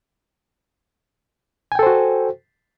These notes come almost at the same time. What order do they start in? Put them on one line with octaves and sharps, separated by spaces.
G#5 G5 A4 C5 F#4